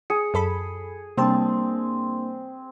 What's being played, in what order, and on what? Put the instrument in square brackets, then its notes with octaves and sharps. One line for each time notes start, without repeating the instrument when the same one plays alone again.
[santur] G#4 [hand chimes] C#7
[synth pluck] F#2 A4 B5
[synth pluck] C3 G3 A5 [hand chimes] A#3 D4 [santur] C4